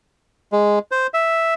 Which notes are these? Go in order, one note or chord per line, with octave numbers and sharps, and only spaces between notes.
G#3
C5
E5